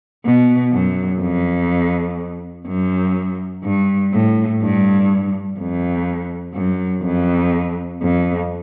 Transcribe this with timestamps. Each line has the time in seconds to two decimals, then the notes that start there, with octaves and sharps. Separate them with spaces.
0.24 B2
0.73 F#2
1.21 F2
2.67 F#2
3.64 G2
4.12 A2
4.61 G2
5.58 F2
6.55 F#2
7.03 F2
8.01 F2